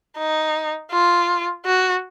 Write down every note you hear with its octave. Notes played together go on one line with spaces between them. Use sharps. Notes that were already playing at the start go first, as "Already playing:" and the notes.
D#4
F4
F#4